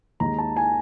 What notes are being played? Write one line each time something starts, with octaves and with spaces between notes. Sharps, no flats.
D#2 D#3 G#3 A#5
A5
G#5